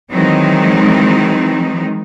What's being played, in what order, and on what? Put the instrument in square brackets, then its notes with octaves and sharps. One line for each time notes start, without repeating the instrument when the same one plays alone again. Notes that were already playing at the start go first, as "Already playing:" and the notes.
[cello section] D#3 E3 F#3 G#3 C4 D#4